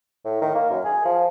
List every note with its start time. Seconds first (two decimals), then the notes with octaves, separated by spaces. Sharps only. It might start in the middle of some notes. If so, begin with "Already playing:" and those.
0.25 A2
0.42 D#3
0.55 A#3
0.71 F#2
0.85 G#4
1.05 F3